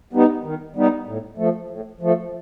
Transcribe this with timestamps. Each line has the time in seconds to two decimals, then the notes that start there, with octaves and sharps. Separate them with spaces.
0.13 G3 B3 D#4
0.44 D#3
0.76 G3 B3 D#4
1.07 A2
1.37 F3 A3
1.70 A2
2.01 F3 A3